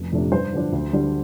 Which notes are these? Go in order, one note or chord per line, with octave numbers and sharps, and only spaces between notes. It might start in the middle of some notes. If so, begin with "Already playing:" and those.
Already playing: F1
F2 C3 A3 D4
G2 C5
D3 F3 D4
D2
D3 G3 D4